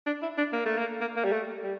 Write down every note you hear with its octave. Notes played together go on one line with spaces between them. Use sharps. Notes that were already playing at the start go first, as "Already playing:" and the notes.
D4
E4
D4
A#3
A3
A#3
A#3
A#3
G3
A3
G3